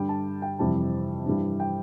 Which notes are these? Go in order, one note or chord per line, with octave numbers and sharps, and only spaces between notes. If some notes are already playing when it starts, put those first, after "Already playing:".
Already playing: G2 D3 G3 G5
A5
G5
F2 C3 E3 G3 A5
G2 E3 G3
G5